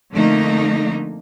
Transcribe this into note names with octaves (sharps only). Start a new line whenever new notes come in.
F2 D3 A3 A#3 D#4